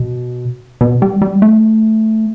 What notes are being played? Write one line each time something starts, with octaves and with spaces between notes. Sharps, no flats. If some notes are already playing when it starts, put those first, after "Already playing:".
Already playing: B2
B2
G3
G3
A3